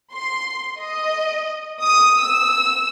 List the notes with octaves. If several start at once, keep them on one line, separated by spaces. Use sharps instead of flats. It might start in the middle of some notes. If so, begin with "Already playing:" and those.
C6
D#5
D#6
E6